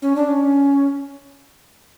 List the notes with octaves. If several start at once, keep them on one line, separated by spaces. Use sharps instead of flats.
C#4
D4
C#4